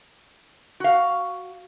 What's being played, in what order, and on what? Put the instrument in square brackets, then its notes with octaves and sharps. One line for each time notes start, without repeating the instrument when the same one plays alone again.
[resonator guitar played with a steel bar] F#4 F5